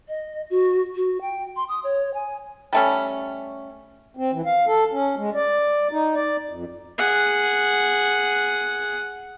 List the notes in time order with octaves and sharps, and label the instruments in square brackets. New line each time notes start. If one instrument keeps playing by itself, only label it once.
[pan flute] D#5
F#4
F#4
G5
C6
D#6
C#5
G#5
[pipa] G3 A3 C#4
[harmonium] C4
E3
F5
A4
C#4
G#3
D5
D#4
D5
F2
[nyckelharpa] G#4 F#5